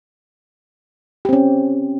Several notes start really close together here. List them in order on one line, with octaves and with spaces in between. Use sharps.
G4 C4 C#4